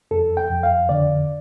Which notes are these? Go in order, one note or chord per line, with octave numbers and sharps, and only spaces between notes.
F2 A4
G5
F2
F5
D3 D5